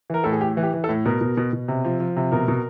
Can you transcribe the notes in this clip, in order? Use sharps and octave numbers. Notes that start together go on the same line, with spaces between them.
E3 A#4
A2 A4
G#4
A2 G4
E3
G4
E3
A4
A2
B2 A#4
B2
B2
B2
C3
F3
F3
C3
B2 A#4
B2